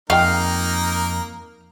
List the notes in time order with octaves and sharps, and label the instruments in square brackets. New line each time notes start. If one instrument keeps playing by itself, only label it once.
[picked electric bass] F2 [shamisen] G#3 F4 G5 [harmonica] A#3 D#4 A#4 [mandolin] F5